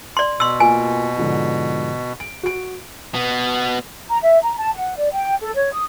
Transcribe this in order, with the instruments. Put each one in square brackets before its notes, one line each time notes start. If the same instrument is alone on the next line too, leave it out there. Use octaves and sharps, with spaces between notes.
[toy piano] D5 C6
[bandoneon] B2 [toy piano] C6 E6
[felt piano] A#3 F4 [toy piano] G#5
[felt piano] G#2 D3 F3
D7
F#4 D7
[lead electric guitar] B2 B3
[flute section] A#5
E5
A#5
A5
F#5
D5
G5
A4
C#5
D#6